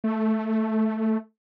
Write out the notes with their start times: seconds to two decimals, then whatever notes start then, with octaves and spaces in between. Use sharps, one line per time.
0.04 A3